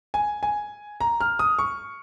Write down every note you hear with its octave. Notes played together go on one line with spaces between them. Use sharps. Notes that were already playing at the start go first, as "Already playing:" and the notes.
G#5
G#5
A#5
F6
D#6
C#6